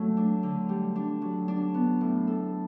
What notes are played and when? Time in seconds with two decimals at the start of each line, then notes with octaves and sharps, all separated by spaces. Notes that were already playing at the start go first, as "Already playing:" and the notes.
Already playing: F#3 A3
0.17 D4
0.43 D3
0.69 G3
0.95 D4
1.22 F#3
1.48 D4
1.74 B3
2.01 A2
2.27 A4